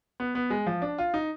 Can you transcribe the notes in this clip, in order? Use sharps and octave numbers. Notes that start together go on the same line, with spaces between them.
B3
B3
G#3
F3
D4
F4
D#4